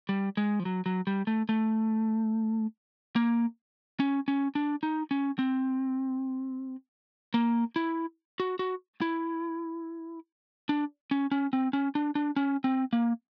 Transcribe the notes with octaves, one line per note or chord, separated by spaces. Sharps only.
G3
G#3
F3
F#3
F#3
G3
A3
A3
A#3
C#4
C#4
D4
D#4
C#4
C4
A#3
E4
F#4
F#4
E4
D4
C#4
C#4
C4
C#4
D4
D4
C#4
C4
A#3